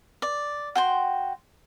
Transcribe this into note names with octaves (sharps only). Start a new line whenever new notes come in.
D5
F#4 G5 C6